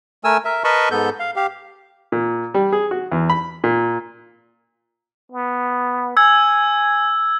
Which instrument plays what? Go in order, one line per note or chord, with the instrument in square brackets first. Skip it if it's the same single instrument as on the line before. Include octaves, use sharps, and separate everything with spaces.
[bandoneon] A3 A#4 G#5 E6
A#4 E5
A#4 B4 D#5 A5 B5 C#6
G#2 B3 A4 G6
F5
G4 F5
[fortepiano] A#2
G3
G#4
F#4
E2
B5
A#2
[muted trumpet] B3
[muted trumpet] G#5 [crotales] E6 G#6